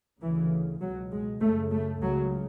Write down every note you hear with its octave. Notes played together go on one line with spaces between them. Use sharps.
D2 C#3 E3
C#2 B2 F#3
G#3
F#2 C#3 A3
A3
C#2 C#3 F#3